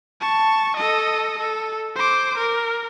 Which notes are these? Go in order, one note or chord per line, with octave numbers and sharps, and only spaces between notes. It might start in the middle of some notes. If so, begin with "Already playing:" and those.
A5 C#6
A4 D#5
A4
C5 D6
A#4